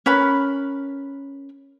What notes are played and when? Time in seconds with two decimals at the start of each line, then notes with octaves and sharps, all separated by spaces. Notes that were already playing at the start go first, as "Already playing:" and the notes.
0.06 C#4 A#4 B4 B5